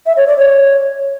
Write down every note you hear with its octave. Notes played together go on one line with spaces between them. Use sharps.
E5
C#5
D5
C#5